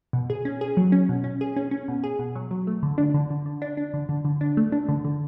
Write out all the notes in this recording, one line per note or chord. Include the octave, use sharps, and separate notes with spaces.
B2
G#4
C#4
G#4
F#3
C#4
B2
C#4
G#4
C#4
C#4
B2
G#4
B2
F#3
F#3
A3
D3
D4
D3
D3
D3
D4
D4
D3
D3
D3
D4
A3
D4
D3
D3